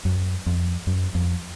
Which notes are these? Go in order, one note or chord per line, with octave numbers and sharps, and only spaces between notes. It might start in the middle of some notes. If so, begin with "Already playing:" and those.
F#2
F2
F#2
F2